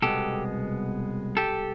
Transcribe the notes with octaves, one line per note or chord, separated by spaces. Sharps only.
C2 B2 G#3 B3 G4 A4
G4 A4